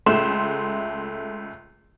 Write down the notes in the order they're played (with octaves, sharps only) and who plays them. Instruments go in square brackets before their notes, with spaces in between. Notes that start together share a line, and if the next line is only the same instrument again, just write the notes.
[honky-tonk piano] C#2 G#3 A3 C6 E7